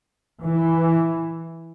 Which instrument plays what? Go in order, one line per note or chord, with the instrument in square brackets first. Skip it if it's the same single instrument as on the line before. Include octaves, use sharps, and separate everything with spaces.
[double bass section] E3